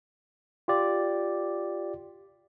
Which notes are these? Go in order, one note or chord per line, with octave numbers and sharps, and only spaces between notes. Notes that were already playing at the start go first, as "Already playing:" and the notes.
F4 G4 D5